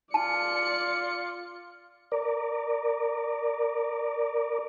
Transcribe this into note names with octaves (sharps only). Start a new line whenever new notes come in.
F4 D5 A5 C#7
A#4 D5